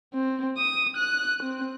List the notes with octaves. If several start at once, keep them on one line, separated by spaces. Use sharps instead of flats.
C4
D#6
F#6
C4